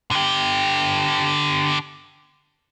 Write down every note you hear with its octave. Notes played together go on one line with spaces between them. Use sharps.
D3 G4